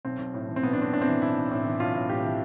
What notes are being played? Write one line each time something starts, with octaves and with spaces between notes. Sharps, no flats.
B1 C4
B1
A2
E3
C4
B1 B3
D4
B1 C4
A2 D4
C4
E3
B1 E4
B1
A2
E3
B1 F4
B1
A2 G4
E3